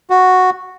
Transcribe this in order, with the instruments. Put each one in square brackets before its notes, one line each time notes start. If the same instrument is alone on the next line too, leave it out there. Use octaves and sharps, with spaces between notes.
[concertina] F#4